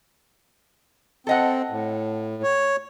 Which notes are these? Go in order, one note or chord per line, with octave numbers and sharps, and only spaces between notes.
C4 A4 D#5 F#5
A2
C#5